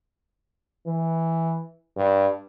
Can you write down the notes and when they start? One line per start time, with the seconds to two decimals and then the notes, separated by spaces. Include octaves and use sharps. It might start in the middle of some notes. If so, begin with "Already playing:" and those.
0.87 E3
1.97 G2